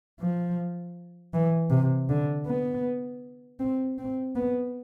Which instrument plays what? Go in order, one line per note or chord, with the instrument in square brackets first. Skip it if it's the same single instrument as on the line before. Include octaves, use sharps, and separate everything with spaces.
[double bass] F3
E3
C3
D3
B3
C4
C4
B3